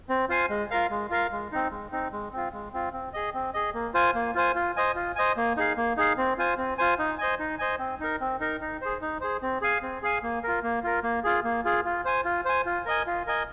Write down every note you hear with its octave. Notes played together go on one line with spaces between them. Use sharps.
C4
F4 C5 F5 G#5
G#3
F4 A#4 F5
G#3
F4 A#4 F5
G#3
C4 D#4
G#3
C4 D#4
G#3
C4 F4
G#3
C4 F4
C4
G#4 D#5
C4
G#4 D#5
A#3
F4 C5 G#5
A#3
F4 C5 G#5
F4
C5 D#5 G#5
F4
C5 D#5 G#5
A#3
D#4 G#4 F5
A#3
D#4 G#4 F5
C4
F4 C5 G#5
C4
F4 C5 G#5
D#4
C5 D#5 G#5
D#4
C5 D#5 G#5
C4
D#4 A#4
C4
D#4 A#4
D#4
G#4 C5
D#4
G#4 C5
C4
G#4 F5 G#5
C4
G#4 F5 G#5
A#3
F4 A#4
A#3
F4 A#4
A#3
F4 G#4
A#3
F4 G#4
F4
C5 G#5
F4
C5 G#5
F4
A#4 D#5 G#5
F4
A#4 D#5 G#5